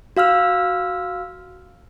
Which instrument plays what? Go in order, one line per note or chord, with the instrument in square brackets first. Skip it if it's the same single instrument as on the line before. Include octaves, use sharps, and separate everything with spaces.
[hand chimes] F#4 F5 E6 F6